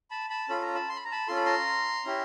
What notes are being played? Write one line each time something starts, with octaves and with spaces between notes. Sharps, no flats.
A5 B5
A5 B5
C#4 F4 A4 B5
A#5
A5 B5
C6
B5
A#5
A5 B5
C#4 F4 A4 C6
B5
A#5 C6
C#4 E4 G4